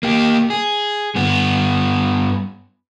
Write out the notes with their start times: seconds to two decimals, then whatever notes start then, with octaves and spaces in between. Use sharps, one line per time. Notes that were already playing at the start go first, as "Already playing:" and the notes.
0.03 A#3 G4
0.50 G#4
1.15 G2 B3